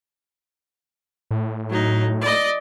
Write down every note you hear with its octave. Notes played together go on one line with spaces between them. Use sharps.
A2
F#3 D#4
D5 D#5